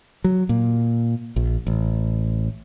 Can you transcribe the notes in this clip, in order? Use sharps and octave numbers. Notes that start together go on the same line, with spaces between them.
F#3
A#2
A#1
A1